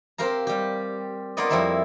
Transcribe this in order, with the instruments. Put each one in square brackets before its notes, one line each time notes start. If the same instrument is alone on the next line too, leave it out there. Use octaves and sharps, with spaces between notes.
[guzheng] C4 G4 A#4 F5 A#5
G3 G4
A#3 B3 F4 D5 D#5
F2 G3 C4 E4 E5 A#5